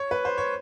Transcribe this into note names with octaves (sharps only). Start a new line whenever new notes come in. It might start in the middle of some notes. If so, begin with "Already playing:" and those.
Already playing: C#5
B4
C5
C#5